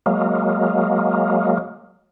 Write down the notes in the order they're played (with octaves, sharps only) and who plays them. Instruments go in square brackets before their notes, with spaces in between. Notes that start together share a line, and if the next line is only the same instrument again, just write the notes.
[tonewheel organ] F#3 G#3 A#3